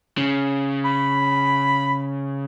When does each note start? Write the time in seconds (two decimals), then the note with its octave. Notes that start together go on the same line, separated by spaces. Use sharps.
0.17 C#3
0.85 B5